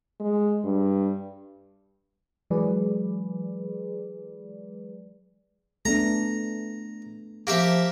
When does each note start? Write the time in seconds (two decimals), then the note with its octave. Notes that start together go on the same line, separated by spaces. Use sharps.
0.20 G#3
0.64 G2
2.50 E3 F#3 G#3 G#4 B4 D5
5.85 A3 B3 D4 A#5
7.47 F3 A#3 G4 E5